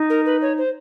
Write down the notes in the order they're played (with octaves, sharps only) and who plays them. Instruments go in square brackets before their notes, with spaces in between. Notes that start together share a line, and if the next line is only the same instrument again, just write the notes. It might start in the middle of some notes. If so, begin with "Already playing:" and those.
Already playing: [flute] D#4
[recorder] A#4
B4
C#5
C5